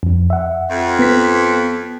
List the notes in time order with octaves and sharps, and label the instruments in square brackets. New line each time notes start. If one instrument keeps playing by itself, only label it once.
[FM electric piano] F2
E5 F#5
[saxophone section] F2
[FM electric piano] B3 B6